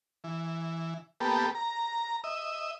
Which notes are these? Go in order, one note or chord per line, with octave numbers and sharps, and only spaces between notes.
E3
A#3 B3 G4 A4
A#5
D#5 E5